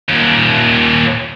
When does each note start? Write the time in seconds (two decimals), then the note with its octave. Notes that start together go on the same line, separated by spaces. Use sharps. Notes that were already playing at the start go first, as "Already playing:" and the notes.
0.09 D#2 A#2